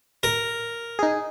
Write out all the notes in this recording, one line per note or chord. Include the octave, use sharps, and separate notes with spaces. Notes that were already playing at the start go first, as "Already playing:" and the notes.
A#4
D#4 G#4